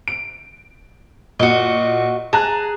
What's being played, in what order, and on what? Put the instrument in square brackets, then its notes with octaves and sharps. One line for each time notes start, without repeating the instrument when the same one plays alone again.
[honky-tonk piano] D7
[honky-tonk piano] A#2 [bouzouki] F#4 D#5
[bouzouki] G#4 [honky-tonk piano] A5 A#5 F#6